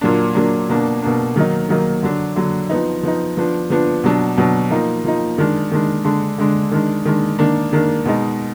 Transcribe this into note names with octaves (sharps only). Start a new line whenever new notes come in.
A#2 F#3 A#3 D4
A#2 F#3 A#3 D4
B2 A#3 D4
B2 A#3 D4
D#3 F#3 A#3 D#4
D#3 F#3 A#3 D#4
D3 F#3 D4
D3 F#3 D4
F3 B3 D#4
F3 B3 D#4
F3 B3 D4
F3 B3 D4
B2 F#3 D4
B2 F#3 D4
F3 A#3 D#4
F3 A#3 D#4
D#3 G#3 D4
D#3 G#3 D4
D3 G#3 D4
D3 G#3 D4
D#3 G#3 D4
D#3 G#3 D4
D#3 A#3 D4
D#3 A#3 D4
B2 G#3 D#4